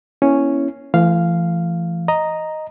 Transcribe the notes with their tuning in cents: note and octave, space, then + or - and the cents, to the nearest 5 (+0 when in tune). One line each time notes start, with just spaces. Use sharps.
A#3 +40 C#4 +0 E4 +0
E3 +40 A3 +0 F5 -5
D#5 +0 A#5 +0